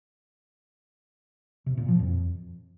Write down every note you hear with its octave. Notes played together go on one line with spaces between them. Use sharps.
C3
A#2
F3
F2